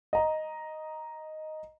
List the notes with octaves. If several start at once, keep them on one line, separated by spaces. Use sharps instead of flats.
D#5 A#5